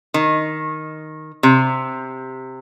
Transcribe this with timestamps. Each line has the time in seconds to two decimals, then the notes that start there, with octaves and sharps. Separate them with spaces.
0.14 D#3
1.43 C3